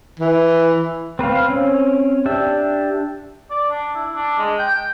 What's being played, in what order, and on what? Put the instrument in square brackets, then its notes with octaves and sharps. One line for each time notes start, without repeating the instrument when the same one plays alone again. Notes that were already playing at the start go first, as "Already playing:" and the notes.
[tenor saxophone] E3
[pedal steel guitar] C4 B4 C5 F5
C4 C#4
D4 G4 E5
[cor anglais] D5
D4
E4
D4
G#3
G5